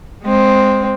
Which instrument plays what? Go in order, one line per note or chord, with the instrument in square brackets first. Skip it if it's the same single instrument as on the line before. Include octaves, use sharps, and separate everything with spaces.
[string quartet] G#3 C4